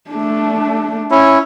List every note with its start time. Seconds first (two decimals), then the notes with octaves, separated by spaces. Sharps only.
0.10 A3 D4
1.11 C#4 E4